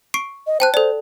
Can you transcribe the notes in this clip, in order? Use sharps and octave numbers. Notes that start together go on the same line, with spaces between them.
C#6 C7 D7
D#5
C5 G5 A5 F#6
A4 C5 D5